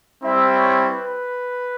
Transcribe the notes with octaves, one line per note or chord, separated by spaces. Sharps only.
G3 C4 E4 E5
C#5
B4